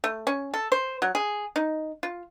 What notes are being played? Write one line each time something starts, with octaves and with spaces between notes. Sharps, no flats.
A3
C#4
A4
C5
F#3
G#4
D#4
F4